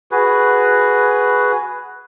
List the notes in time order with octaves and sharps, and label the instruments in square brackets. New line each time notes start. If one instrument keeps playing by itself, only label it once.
[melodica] F#4 G#4 B4